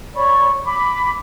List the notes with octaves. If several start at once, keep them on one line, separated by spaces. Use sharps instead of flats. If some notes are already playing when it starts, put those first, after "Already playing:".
C#5 D5 B5 C#6
B5 D6